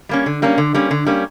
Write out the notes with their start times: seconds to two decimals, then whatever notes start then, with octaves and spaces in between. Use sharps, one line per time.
0.09 G3 A#3 C#4
0.26 D3
0.42 G3 A#3 C#4
0.58 D3
0.74 G3 A#3 C#4
0.91 D3
1.06 G3 A#3 C#4